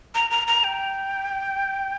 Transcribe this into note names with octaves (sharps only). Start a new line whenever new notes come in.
A#5
A#5
A#5
G5